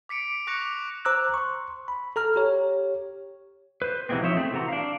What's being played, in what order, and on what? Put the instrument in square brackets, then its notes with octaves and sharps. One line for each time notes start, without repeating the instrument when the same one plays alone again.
[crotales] D6 B6 C#7 D7
C#6 D6 F#6 A#6 C#7 F7
[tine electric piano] C5 A#5 D6 E6 F#6
C6 C#6
B5
A4 A#5 F6
G4 C#5
[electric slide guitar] B4 C5
C3 E3 F3 G#3 B3 C4
F3 D#4 C5 C#5 E5
A3 C4 G#4
C3 E3 F#4 A#5
D4 F5